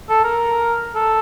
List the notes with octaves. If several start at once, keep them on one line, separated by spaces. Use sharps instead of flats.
A4
A#4
A4